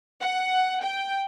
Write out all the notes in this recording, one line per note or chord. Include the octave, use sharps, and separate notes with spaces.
F#5
G5